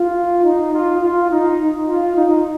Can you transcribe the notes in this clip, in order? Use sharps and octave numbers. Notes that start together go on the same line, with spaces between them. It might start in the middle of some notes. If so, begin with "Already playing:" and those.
Already playing: F4
D#4
F4
F4
D#4
F4
D#4